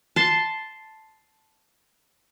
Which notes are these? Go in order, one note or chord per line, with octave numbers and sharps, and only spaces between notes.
A5 C6